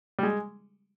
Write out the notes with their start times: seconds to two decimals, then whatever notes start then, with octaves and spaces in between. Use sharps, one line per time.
0.19 G3
0.23 G#3